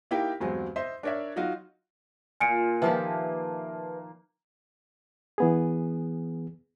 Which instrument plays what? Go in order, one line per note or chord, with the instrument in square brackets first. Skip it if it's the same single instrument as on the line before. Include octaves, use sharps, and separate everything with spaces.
[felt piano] A#3 D#4 E4 G4 A#4 G5
E2 G2 F#3 G#3 C4
C5 D#5 E5 C6
D4 A#4 C#5 D5 E5
F#3 D#4 F4 F#4
[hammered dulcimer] A#2 F4 [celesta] G#5 C#7 D7
[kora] D#3 F3 G4 [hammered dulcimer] A#3 [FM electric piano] B4 E5 A5
[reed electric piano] E3 B3 G#4